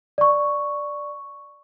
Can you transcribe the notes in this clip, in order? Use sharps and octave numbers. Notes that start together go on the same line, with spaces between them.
D5 C#6